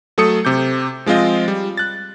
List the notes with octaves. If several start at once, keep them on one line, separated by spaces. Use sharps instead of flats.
F#3 A3 A4 D#6 C#7
C3 D6 G6
F3 G#3 C4 F4 D#5
G3
F#6 A6